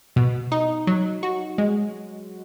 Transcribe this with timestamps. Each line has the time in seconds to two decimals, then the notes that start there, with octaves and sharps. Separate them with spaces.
0.16 B2
0.52 D#4
0.87 F#3
1.23 F#4
1.58 G#3